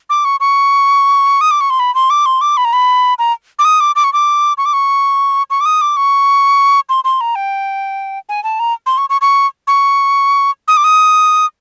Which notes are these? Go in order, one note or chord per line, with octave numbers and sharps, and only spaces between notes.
D6
C#6
C#6
D#6
D6
C#6
C6
B5
C6
D6
C6
D6
B5
A#5
B5
A#5
D6
D#6
D6
D6
C#6
D6
C#6
D6
C#6
C#6
D6
D#6
D6
C#6
C6
C6
A#5
G5
G#5
A5
A#5
C6
C#6
C#6
C#6
C#6
D#6
D6
D#6